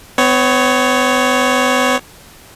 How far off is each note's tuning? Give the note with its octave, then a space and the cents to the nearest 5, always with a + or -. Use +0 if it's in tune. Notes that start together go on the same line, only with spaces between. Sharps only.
B3 +40 C#5 +0